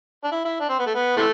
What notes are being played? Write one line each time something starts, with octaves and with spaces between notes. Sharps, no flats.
D4
E4
E4
D4
C4
B3
A3
B3
C3 E3 A3